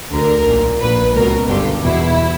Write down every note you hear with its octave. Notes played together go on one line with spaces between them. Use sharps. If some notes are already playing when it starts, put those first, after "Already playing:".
D2 D3 A#4
B1 A#2
A#1 A#2 B4
C#2 B2 A#4
G1 G2 D3 G4
E2 B2 E4